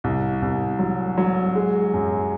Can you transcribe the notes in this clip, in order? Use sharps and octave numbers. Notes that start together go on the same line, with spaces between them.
C2
C2
F#3
F#3
G#3
F#2